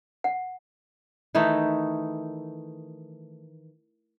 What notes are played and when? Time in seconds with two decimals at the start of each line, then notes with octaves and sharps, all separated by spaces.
0.24 F#5
1.35 D#3 E3 A3 D#4